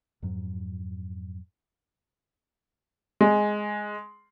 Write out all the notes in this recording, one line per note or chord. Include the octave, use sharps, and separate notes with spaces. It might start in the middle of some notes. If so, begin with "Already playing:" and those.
F2 G#2 F#3
G#3